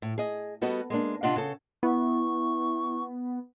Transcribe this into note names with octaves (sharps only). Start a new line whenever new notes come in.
A2
G#4 D#5
G3 B3 F#4 A4 D#5
G#3 A#3 D4
C3 D4 F4 D#5 F#5
C#3 A4
B3 E4 C#6